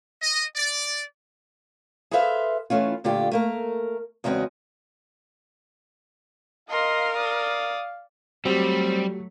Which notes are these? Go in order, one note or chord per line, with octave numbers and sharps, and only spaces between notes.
D#5
D5
G#4 A4 B4 C5 E5 F5
E3 A3 C#4 F4
A#2 D3 A3 F4 G4
A3 A#3 A#4
E2 C#3 G#3 C4 F#4 D#5
A#4 D#5 F5 C6
D5 D#6
F#3 G3 A3 C4 F#4 G4